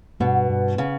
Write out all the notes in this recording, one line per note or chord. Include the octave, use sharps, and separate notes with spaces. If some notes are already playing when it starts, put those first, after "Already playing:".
G2 B2
G2
C#3